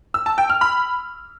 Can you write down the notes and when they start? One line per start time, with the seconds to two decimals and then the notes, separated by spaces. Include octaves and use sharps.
0.14 E6
0.26 A5
0.38 G5
0.50 F6
0.61 B5